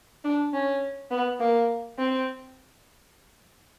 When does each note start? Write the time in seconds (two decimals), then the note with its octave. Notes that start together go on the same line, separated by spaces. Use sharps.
0.25 D4
0.54 C#4
1.11 B3
1.40 A#3
1.98 C4